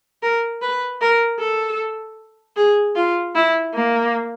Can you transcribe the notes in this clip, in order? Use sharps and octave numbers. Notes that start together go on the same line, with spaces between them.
A#4
B4
A#4
A4
G#4
F4
E4
A#3